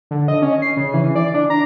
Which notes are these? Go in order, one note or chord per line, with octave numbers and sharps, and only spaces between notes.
D3
D#5
C#4
C7
C#3
E3
D5
D4
A#5